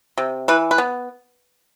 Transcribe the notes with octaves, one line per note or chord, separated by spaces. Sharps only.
C3
E3 B4
B4
B3